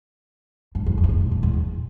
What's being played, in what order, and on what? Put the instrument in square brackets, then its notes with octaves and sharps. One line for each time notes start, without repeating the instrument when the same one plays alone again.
[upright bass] G2
E2
F2
G2
G#2
A#2
A#2
E2
G2